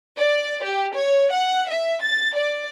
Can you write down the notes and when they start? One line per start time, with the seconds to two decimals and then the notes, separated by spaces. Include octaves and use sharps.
0.18 D5
0.64 G4
0.95 C#5
1.33 F#5
1.69 E5
2.02 A6
2.36 D5